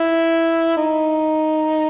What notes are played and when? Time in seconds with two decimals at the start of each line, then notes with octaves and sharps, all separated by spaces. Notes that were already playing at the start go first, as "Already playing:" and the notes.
Already playing: E4
0.77 D#4